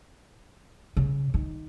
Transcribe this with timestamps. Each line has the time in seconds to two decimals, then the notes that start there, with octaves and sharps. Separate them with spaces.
0.97 C#3
1.34 D#3